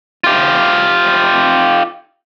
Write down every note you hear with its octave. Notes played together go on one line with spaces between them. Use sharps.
F4 G4